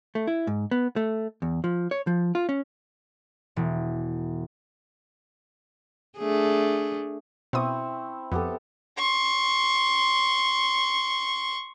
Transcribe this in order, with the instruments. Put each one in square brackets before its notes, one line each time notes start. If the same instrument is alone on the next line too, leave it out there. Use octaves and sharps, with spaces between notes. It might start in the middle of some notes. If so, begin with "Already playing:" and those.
[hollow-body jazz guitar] A3
E4
G#2
B3
A3
E2
F3
C#5
F3
F4
C#4
[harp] E1
[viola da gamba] A3 D4 G#4
[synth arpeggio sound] B2 D#6 [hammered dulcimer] C4 E4 C#6
[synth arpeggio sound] F2 [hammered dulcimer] B3 G4 A4
[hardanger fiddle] C6 C#6